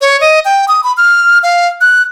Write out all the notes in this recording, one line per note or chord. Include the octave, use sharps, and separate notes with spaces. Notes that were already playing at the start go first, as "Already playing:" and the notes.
C#5
D#5
G5
D#6
B5
F6
F5
F#6